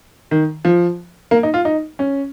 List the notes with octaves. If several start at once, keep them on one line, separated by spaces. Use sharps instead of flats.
D#3
F3
A#3
D#4
F4
D#4
C#4